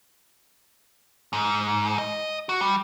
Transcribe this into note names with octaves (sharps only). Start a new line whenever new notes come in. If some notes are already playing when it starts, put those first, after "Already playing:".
G#2
D#5
F#4
G3